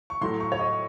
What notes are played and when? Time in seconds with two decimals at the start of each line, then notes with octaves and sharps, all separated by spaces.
0.10 C#6
0.21 A2 F#3 A3 C6
0.40 C#6
0.52 C#5
0.59 D#5